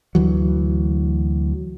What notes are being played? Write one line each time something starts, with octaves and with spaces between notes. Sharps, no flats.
D2 E3 F#3